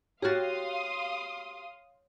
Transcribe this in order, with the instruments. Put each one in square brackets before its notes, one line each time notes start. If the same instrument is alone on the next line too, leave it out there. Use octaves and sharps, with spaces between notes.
[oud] F#4 G4 [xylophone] C#5 F6 A6 [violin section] F5 C6 D#6